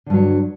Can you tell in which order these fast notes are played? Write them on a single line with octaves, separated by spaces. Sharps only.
D3 G2 F#3